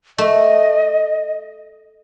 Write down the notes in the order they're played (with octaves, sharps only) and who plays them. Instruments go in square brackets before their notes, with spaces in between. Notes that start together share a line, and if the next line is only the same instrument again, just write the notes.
[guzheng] A3 [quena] D#5